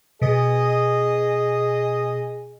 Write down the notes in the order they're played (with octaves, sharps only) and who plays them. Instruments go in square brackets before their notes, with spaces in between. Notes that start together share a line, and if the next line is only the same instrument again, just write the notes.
[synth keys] B2 [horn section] G#4 D#5